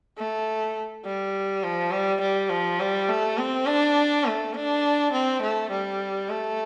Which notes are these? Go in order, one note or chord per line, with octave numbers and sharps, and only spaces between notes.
A3
G3
F3
G3
G3
F3
G3
A3
C4
D4
A3
D4
C4
A3
G3
A3